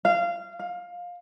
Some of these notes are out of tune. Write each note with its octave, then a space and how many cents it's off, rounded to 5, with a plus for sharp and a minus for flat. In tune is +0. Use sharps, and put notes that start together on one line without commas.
F5 -20
F5 +20